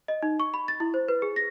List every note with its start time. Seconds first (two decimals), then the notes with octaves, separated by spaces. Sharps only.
0.08 D#5
0.23 D#4
0.40 C#6
0.54 B5
0.68 A6
0.80 E4
0.94 C5
1.08 B4
1.22 G#4
1.36 A#6